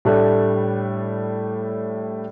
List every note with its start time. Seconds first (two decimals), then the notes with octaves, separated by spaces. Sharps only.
0.05 A2 G3 A3 D4 A5 F#6